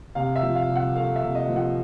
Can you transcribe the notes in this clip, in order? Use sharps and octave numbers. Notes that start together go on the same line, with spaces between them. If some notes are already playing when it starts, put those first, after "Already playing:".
C3 F5
E5
F3
F5
C2
F#5
A3 F5
E5
C3
D#5
F3
F#5